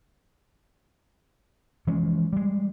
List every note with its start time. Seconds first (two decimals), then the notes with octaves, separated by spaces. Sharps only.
1.87 E3 F3 G#3 C#4
2.33 G3 G#3